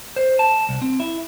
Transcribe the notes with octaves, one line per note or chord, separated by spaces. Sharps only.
C5
A5
C2
C4
E4